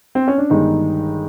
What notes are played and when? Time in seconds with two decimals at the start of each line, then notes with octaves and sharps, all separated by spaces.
0.15 C4
0.28 C#4
0.38 D4
0.50 G1 G2 D#3 G#3 D#4